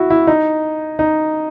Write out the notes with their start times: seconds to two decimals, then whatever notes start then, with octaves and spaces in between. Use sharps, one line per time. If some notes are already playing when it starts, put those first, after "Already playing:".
Already playing: E4 F#4
0.10 E4
0.27 D#4
0.99 D#4